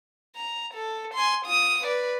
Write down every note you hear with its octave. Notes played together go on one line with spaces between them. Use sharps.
A#5
A4
G#5 C6
F4 D#6
B4 D5